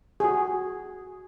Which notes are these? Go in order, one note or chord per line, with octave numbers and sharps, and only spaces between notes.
F#4 G#4